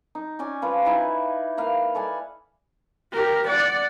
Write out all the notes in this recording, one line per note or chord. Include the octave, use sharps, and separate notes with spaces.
D#4
C#4 D5 G#5
F3 F4 B4
D#4 E4 D5 G#5
A#3 B4 F5
A4 D5 G#5
G4 A#4
D5 F#5